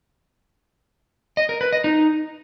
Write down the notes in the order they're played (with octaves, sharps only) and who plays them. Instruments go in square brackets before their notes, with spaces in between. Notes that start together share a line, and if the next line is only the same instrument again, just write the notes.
[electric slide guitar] D#5
A#4
B4
D#5
D#4